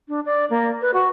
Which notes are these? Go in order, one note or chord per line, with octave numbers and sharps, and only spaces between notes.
D4
D5
A#3
B4
F#4